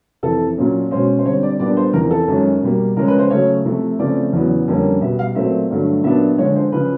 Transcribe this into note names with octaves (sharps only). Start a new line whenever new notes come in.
F2 C3 E3 A4
A#2 F#3 A#3 C#4
B2 G#3 C#4 C5
C5
D3 G3 C4 C#5
D5
A#2 G3 B3 D4 D5
C5
E2 C3 F3 A#4
A4
F#2 D#3 G#3 C#4
B2 G3 A#3
C#3 F3 G#3 C#4 A#4
B4
C5
C#3 F#3 A3 C#5
C3 F3 A3
C#3 F3 A3 C4 D5
E2 C#3 F#3 B3
F2 D3 G3 A#3 C#4
B2 G3 B3 E5
F5
A#2 F#3 A3 C4 E5
G2 D3 F#3 A3
A#2 F#3 B3 D4 E5
D3 F3 G#3 C#5
C5
C#3 F3 B4